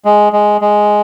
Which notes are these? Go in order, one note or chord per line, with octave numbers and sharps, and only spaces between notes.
G#3
G#3
G#3